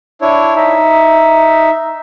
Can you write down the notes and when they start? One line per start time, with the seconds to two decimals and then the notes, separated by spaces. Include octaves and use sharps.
0.21 D4 E4 C#5
0.56 D#4 E5